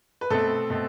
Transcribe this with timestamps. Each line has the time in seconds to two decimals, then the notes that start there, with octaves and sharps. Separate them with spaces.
0.21 B4
0.30 B2 A3 C4 A4
0.70 B2 A3 C4